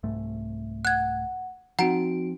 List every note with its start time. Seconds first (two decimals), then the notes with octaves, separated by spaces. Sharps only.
0.03 C2 G#2 A3
0.85 F#5 F#6 G#6
1.79 F3 C4 D#4 F#4 F#5 A#5 D7